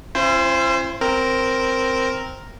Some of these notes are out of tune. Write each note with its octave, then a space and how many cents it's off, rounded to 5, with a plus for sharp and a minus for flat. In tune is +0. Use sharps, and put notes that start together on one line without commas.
C#4 -45 E4 +45 C5 +0
C4 +0 A#4 +0